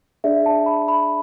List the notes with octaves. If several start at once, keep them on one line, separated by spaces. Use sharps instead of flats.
D4 G#4 D5 E5
A5
B5
B5